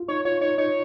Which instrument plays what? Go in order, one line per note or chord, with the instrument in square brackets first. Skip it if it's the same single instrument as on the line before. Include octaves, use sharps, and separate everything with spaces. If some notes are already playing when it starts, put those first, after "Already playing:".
Already playing: [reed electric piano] F4
[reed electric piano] D#4 [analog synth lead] C#5
[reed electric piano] F4 [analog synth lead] C#5
[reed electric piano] D#4 [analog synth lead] C#5
[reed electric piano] D#4 [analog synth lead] C#5